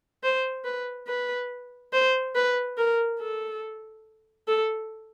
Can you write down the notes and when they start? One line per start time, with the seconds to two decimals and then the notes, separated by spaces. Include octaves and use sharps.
0.23 C5
0.65 B4
1.07 B4
1.93 C5
2.35 B4
2.77 A#4
3.20 A4
4.48 A4